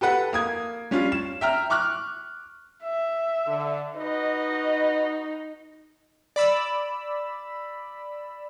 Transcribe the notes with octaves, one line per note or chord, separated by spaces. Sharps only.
G4 A4 B4 F#5
A#3 D#6 G#6
G3 C#4 D4 F4
E7
E5 G5 A#5 F6
C#6 D6 F6 F#6
E5
D3
D#4 F#4 B4 D#5
D5 B5 E6